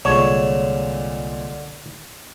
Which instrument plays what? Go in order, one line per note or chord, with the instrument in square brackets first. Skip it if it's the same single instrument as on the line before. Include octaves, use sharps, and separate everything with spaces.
[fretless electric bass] C2 [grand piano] A#2 G#3 [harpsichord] D3 [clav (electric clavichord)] C#5